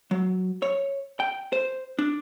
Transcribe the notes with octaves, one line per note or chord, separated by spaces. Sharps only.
F#3
C#5
G5
C5
D4